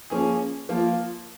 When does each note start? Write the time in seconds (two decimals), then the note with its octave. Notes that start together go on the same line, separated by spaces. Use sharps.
0.10 F3 A#3 C#4 G#4
0.69 F3 A#3 F4